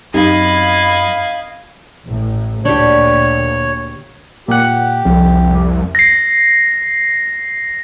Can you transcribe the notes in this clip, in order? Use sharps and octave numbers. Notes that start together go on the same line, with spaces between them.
F#2 C4 D#4 G4 D#5 F5 B5 G#6
A1 A2
D2 A#2 D4 G4 C#5
A#2 G4 F#5
C2 F2
A#6 C7